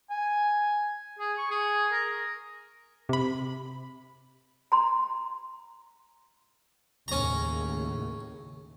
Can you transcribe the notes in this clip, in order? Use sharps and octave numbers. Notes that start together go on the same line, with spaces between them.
G#5
G#4
C#6
G#4
A#4
C3 B5
A#5 C6
D#2 A2 C#3 C#4 A#5